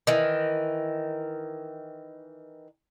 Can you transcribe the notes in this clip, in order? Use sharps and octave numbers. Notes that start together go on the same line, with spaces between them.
D#3 E3